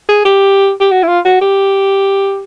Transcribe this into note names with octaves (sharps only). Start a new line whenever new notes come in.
G#4
G4
G4
F#4
E4
F4
F#4
G4